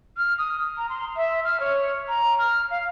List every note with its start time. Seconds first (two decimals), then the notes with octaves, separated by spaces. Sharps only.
0.17 F6
0.38 D#6
0.77 A#5
0.89 C6
1.16 E5
1.44 F6
1.60 C#5
2.08 A#5
2.39 F6
2.71 F5